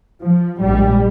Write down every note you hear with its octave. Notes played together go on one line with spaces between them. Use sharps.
F3
A#1 G#2 G3